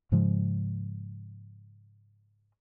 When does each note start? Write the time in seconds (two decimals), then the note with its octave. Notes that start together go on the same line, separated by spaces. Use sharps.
0.12 G#2 C#3 F3 G#3